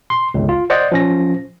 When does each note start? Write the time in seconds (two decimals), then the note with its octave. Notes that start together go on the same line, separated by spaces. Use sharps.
0.10 C6
0.34 G1 C#2
0.49 F4
0.70 C5 D5 D#5 F#5
0.92 F3 C#4 A#6